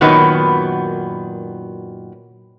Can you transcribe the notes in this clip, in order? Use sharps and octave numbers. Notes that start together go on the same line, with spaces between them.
F#2 A#2 D#3 F#3 B3